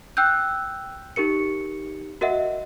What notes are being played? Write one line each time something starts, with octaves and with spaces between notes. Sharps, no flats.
G5 E6 F#6 G6
D#4 G4 A#4 C#7
F#4 A#4 D#5 E5 F#5